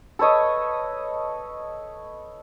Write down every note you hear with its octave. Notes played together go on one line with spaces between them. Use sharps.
A4 B4 C#5 D#5